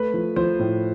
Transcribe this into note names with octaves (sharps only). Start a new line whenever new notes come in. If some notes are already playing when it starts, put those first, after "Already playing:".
Already playing: A3 B4
F3
F3 C5
A2